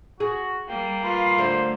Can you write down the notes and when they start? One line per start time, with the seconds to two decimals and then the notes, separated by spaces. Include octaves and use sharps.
0.20 F#4 G#4
0.68 G3 A#3 G5
1.03 F4 B4
1.38 D3 A3 C5